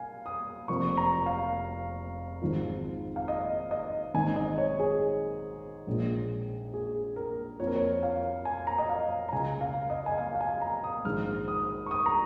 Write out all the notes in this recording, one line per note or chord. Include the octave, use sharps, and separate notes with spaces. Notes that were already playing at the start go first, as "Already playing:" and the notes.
Already playing: F5 G#5
D#6
F1 F2 F3 A#3 C#6
A#5
F5
G#1 G#2 F3
F5
D#5
D#5
G#1 G#2 D#3 G#3 G#5
D#5
C#5
G#4
A#1 A#2 G#3
G#4
A#4
F2 F3 A#3 C#5
A#4
C#5
F5
G#5
A#5
D#5
F5
A#5
C#2 C#3 G#3 G#5
F5
D#5
G#5
F5
F5
G#5
A#5
D#6
A#1 G#2 D#3 G#3 F6
D#6
C#6
D#6
A#5